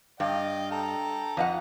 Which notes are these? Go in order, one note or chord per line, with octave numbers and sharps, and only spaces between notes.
G2 D#5 F5 G5
A4 G5 A#5
F2 D#5 F#5